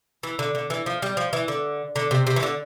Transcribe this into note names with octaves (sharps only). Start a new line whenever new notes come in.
E3
D3
D3
E3
F3
G3
F3
E3
D3
D3
C3
C3
E3
D3